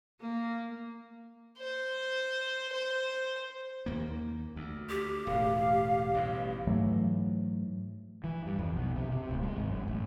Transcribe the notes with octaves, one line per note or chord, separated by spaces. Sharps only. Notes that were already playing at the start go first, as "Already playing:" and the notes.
A#3
C5
C5
D#2 A#3
D2
G4
E1 A2 F5
A1 G2 B2
G#2 E3 F#3 A3
E3
G2
F2
B1
C3
C3
D1
G#3
G#1
F#2
A1